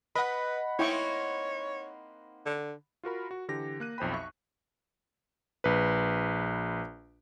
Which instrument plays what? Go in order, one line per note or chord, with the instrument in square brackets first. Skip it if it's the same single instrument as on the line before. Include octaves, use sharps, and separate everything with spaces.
[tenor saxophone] B4 [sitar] D#5 [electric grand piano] F#5 B5
[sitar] A#3 C4 D#4 [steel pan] E4 G5 C#6 [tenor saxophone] C#5
[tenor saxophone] D3
[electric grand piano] F4 F#4 A#4 B5
F#4
D3 E3 G4 A#6
A#3 F#6 D#7
B1 F2 C5 G5 B5
E5 C#6
A#1 B4